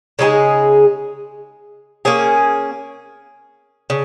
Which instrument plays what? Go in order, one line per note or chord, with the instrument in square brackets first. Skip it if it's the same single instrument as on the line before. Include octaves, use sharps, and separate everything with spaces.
[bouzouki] C#3 G#3 D#4 G#4
A#3 C#4 G#4
C#3